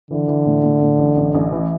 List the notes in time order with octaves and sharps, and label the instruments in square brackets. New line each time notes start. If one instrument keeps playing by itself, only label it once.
[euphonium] D3 [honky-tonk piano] E3
[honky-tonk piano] E3
A2
A2
A2
A1
A1
A1
E3